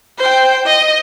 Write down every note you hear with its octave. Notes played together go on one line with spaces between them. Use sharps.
C5 G5
D#5